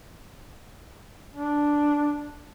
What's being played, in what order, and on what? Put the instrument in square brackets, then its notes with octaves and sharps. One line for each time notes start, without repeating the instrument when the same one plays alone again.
[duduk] D4